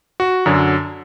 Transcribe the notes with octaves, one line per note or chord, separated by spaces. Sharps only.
F#4
F#2 D3 F#3